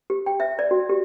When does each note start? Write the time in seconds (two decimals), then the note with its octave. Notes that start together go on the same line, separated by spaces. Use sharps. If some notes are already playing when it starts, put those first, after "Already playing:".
0.10 G4
0.26 G5
0.40 E5
0.59 D5
0.71 F#4
0.89 G4